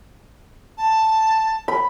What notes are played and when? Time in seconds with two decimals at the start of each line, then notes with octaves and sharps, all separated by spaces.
0.78 A5
1.68 B5